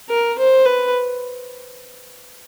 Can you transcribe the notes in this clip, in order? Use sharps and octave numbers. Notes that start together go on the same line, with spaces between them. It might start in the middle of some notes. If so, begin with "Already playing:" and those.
A#4
C5
B4